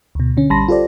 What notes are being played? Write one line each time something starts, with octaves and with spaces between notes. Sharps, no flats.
D2 B2
D3 C#4
A1 G3 A5 B5 C6 A#6
F4 G4 A4 C5 D5